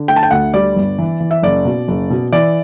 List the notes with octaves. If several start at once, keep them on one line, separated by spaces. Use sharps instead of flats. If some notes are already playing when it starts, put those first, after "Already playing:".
Already playing: D3
A3 G5
A5
G5
D2 F#5
G3 D5
G1
E3
E3
E5
F#1 D5
B2
F#1
B2
E3 D5